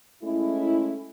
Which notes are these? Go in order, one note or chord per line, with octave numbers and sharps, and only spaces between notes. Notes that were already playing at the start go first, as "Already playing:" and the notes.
G#3 A3 C#4 E4